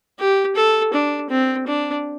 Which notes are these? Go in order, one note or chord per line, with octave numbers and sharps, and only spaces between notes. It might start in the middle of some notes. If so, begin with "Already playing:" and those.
G4
A4
D4
C4
D4